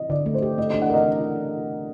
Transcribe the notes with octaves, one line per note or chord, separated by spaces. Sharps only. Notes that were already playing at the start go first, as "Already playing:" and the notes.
Already playing: D#5
D3 D5
A3
C5
G4
A3 D#5
D4 D#5
F#5
A#4 D#5